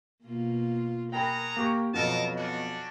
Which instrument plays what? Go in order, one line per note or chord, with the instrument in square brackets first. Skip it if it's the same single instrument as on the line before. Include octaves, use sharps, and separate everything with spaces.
[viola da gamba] B2 A#3 F4
[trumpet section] F#4 G#4 A#5 [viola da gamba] A#4 [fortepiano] G5 B5
[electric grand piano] A#3 G4 C#6
[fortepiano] F2 B2 [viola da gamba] F#3 [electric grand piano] B3 [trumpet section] A4 A#4 A5
[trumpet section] C#4 D4 F#4